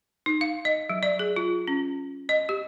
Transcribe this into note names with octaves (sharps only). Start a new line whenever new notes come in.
D#4
F5
D#5
F#3
D5
G#4
F4
C#4
D#5
G4